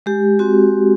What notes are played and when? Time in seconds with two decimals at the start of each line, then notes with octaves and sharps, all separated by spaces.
0.06 G#3 G4
0.39 C4 F#4